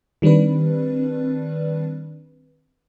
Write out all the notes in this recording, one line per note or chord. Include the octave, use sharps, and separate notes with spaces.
D#3 G3 C4 D4 B4